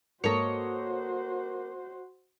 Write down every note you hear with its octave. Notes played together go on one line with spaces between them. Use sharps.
G#2 A#3 F#4 A4 A#4 C5 C#5 D#5